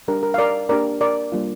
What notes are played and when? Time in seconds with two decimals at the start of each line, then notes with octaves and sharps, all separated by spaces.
0.08 G3 D4 G4 A#4
0.23 A#4
0.34 F5
0.38 A#4 D5
0.69 A#3 D4 G4 A#4 D5
1.01 A#4 D5
1.32 G3 A#3 D4 F4